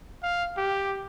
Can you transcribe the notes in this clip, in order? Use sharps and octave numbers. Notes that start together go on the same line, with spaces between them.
F5
G4